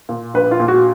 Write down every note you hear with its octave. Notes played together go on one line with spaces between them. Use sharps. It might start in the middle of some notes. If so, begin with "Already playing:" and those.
A#2
A#1 B4
F4
A#2
F#4